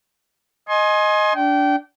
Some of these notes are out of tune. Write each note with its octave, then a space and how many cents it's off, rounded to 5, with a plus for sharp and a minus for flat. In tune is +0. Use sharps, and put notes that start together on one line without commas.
D#5 +0 G#5 +15 C6 +30
D4 -15 G5 -25